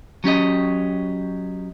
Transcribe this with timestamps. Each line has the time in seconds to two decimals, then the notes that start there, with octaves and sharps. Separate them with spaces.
0.24 F#3 C#4 G4 D#5